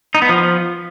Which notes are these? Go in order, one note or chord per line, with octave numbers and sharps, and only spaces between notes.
D#4
B3
F3